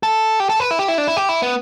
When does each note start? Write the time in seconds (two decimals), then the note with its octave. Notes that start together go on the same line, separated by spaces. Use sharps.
0.03 A4
0.40 G4
0.50 A4
0.60 B4
0.71 E4
0.79 G4
0.88 E4
0.98 D4
1.08 E4
1.17 G4
1.29 E4
1.42 B3